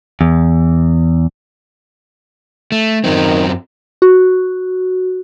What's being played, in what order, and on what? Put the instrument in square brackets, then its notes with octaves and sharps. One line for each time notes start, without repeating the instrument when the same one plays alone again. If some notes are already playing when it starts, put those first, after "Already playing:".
[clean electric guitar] E2
[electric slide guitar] A3
[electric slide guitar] F#2 F#3 C4 [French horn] D#3
[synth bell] F#4